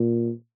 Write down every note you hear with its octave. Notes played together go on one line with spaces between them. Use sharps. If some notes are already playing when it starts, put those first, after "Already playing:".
Already playing: A#2